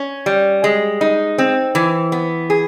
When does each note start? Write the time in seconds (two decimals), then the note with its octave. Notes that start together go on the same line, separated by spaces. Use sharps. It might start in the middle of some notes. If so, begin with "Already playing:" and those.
Already playing: C#4
0.26 G3
0.64 G#3
1.01 D#4
1.38 C4
1.75 E3
2.12 B3
2.50 G#4